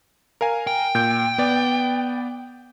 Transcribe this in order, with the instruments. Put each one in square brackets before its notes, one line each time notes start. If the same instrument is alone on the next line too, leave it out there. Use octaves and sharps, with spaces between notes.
[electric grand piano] A#4 F5 G#5
[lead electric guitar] G5
[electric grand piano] A#2 G6 D7
B3 D5